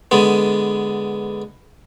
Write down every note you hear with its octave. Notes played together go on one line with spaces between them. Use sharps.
D3 G#3 B3